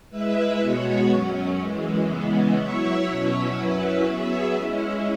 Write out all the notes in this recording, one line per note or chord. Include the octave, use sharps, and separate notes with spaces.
G#3 E4 B4 E5
B2 G#3 B3 F#4 C#5
F#2 F#3 C#4
F#2 E3 G#3
C#3 E3 G#3 B3
F#3 E4 C#5 E5
B2 F#3 C#4 E4 C#5
F#2 F#3 C#4 E4 B4
F#3 B3 G#4 E5
G#3 C#4 E4